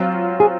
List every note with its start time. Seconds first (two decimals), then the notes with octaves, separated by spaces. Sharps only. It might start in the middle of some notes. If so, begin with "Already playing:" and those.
Already playing: F#3 C4 F4
0.40 G#4